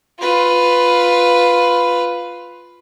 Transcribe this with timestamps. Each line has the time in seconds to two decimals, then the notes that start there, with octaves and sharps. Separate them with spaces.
0.20 F4 B4